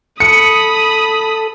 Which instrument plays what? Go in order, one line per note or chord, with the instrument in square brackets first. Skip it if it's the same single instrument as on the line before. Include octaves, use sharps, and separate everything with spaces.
[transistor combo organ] A4 [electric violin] B5 D#6 [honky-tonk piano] C#7